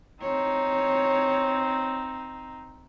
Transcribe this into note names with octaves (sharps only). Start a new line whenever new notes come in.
C4 D#4 C#5